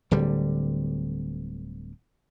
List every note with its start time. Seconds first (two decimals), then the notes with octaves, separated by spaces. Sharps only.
0.11 D1 D3 G3